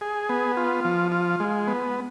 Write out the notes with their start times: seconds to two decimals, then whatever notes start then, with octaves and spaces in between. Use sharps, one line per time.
0.01 G#4
0.29 B3
0.57 F4
0.85 F3
1.12 F4
1.40 G#3
1.67 B3